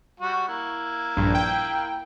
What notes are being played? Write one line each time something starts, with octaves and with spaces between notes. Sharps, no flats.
G3 F#4
A#3 E4
A#1 G2
G5